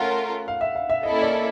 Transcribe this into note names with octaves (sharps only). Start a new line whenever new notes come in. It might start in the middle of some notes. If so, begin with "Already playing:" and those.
Already playing: A3 C#4 F4 A#4 F#5
F5
E5
F5
E5
A#3 C#4 E4 A4 D#5
D5